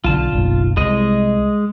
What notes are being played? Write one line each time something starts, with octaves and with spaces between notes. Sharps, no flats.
B1 D3 F4 A5
F#1 B1
C2 G#3 D#5